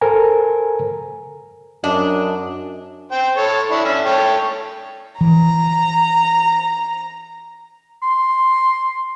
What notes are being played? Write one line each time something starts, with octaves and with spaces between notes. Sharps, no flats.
A4 A#4 C5 G#5 A#5
F#2 D4 D#5
C5 G5
A4 C#5
D4 E4
C#4 D4 E5
A4 C#5 G5
E3 A#5
C6